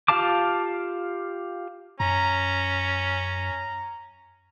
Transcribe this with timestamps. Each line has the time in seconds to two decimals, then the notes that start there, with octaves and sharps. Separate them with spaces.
0.08 F4 G4 F5 A5 D6
2.00 F#2 C#4 A#5